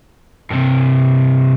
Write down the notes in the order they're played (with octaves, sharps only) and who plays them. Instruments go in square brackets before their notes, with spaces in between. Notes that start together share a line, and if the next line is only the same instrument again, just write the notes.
[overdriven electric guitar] G2 C3